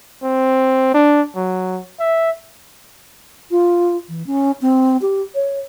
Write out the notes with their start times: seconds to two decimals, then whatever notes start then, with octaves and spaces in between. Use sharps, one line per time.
0.23 C4
0.94 D4
1.36 F#3
2.00 E5
3.51 F4
4.09 E3
4.27 C#4
4.62 C4
5.02 G4
5.35 C#5